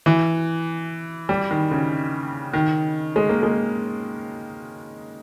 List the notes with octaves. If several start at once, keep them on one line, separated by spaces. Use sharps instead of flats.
E3
G3
D#3
C#3
D#3
G#3
A#3
G#3